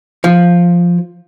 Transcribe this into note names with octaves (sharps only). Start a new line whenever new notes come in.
F3